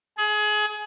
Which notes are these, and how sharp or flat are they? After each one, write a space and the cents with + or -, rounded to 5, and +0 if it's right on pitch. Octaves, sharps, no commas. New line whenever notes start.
G#4 +25